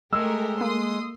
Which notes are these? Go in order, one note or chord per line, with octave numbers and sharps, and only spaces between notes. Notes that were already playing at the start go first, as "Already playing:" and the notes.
G#3 A3 G4 A#4 E6
A#3 C6 D#6